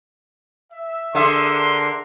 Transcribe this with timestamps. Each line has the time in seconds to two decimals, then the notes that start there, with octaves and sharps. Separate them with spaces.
0.72 E5
1.15 D3 D4 G#4 A#4 E5 C6